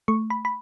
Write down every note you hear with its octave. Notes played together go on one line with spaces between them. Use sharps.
A3 C#6
B5
B5